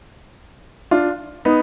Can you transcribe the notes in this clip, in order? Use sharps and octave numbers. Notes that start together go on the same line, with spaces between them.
D4 F4
B3 D#4